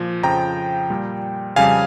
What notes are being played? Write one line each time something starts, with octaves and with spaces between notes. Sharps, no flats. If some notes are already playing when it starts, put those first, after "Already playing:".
Already playing: A#2 F3
F2 C#3 F3 G5 A#5
A#2 G3
F2 C#3 G3 F5 G#5